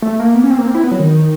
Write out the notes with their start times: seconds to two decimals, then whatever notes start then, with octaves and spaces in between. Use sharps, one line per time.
0.02 A3
0.20 A#3
0.35 B3
0.44 C#4
0.50 C4
0.58 A#3
0.67 C4
0.75 E4
0.84 B3
0.91 F#3
0.99 D#3